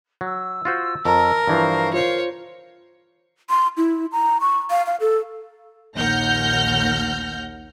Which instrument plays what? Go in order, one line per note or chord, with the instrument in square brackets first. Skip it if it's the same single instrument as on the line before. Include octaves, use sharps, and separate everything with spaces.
[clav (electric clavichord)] F#3 [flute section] E6
[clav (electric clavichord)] F4 F#4 C5
[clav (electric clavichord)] F2 [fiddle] A#4 [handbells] A5 A#5
[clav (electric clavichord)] G2 E3 F3 [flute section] C5 F5 C#6
[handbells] F4 C5 [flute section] A#4 F5 [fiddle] C#5
[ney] C6
E4
A#5
C#6
F5
F5
A4
[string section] A#1 D#2 F#5 F6 G6 A#6